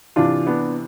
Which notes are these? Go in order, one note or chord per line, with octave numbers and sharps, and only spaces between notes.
C3 E3 D4 F4
B3 D4